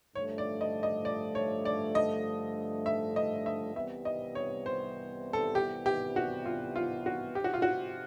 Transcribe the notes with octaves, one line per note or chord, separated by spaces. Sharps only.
G2 D3 F3 A3 C#5
D5
D#5
D#5
D5
C#5
D5
D#5
E5
D#5
E5
C2 C3 E3 G3 B3 E5
D#5
C#5
C5
A4
G4
G4
F#4
F4
F4
F#4
G1 F2 C3 G4
F#4
F4
F#4